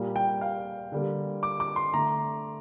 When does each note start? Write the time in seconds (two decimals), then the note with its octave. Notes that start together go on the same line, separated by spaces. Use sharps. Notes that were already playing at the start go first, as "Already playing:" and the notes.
Already playing: A#2 G3 A#3
0.16 G5
0.41 F5
0.92 D3 G3 A#3
1.43 D6
1.60 D6
1.76 C6
1.93 D3 A3 A#5